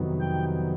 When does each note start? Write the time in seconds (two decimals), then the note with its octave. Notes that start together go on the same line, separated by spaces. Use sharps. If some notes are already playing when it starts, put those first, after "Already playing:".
Already playing: F2 C3 D#3 F#3 B3
0.20 G5